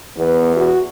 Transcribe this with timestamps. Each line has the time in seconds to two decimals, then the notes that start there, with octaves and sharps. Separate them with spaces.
0.18 E2 B3
0.56 F#4